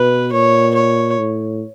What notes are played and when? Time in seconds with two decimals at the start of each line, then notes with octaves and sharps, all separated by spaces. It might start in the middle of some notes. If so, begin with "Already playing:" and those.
Already playing: B2 B4
0.32 A#2 C#5
0.75 C#5
1.19 A2